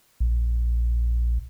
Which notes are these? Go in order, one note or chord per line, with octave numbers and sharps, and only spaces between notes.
A#1